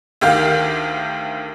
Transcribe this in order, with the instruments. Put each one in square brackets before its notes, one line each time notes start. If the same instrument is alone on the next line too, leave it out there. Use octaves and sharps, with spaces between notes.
[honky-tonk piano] D2 D#3 G4 F5